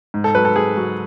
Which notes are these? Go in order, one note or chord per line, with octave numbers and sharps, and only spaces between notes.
G#2
A4
F#3 B4
A4
G#2 G#4
F#3